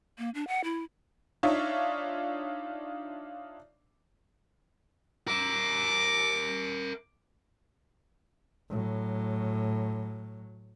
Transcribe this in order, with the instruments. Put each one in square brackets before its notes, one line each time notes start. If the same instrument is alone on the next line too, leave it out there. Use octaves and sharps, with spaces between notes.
[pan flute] A#3
D4
F#5
E4
[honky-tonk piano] D4 D#4 F4 C#5 E5
[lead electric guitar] A#4 E5 [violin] D6
[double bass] A2 F#3